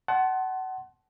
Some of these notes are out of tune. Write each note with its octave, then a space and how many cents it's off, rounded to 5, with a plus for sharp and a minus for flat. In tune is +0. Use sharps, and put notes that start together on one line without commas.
F#5 +25 A5 -20 C6 +10